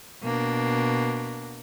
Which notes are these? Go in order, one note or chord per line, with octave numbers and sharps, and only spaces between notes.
B2 A#3 D4